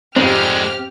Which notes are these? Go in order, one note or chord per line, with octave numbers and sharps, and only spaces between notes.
F2 G#2 D3 G#3 C4 G4 F6